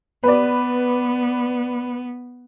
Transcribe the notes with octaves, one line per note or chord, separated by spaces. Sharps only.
B3 B4 D5